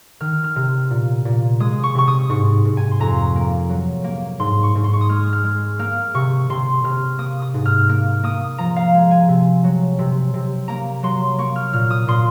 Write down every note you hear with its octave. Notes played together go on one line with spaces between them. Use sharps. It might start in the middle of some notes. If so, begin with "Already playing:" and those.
D#3 F6
F6
C3
A#2
A#2
G#3 D#6
C#6
C3 C#6
D#6
G#2 C#6
G#2
G#5
C6
F2 A#5
A#3
F#3
A#3
G#2 C6
C#6
G#2
C6
C#6
D#6
G#3 F6
F6
G#3
A#3 F6
C3 C#6
C3 C6
C3 F6
A#3 D#6
D#6
G#2
F6
A#3 F6
A#3 D#6
F3 A#5
F5
G#3
G#5
C3
F#3
C3
C3
A#3 A#5
F#3 C6
A#3 C#6
F6
A#2 F6
D#6
A#2 C6